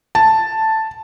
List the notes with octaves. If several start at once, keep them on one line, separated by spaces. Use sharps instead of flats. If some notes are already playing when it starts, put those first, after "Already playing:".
A5